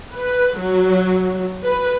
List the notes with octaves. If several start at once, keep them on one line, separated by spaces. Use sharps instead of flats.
B4
F#3
B4